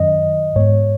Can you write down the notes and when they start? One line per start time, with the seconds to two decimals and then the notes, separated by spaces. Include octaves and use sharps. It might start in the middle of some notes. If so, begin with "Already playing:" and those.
Already playing: F#2 D#3 F#3 C#4 D#5
0.56 G#2 G#3 B3 C#5